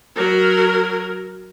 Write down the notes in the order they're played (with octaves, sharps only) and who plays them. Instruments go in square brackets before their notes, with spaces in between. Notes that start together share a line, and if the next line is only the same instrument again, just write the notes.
[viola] F#3 A#4